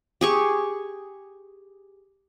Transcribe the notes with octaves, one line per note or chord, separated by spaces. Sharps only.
G4 G#4 C#6